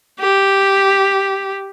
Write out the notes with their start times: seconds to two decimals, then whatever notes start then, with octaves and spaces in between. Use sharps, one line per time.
0.20 G4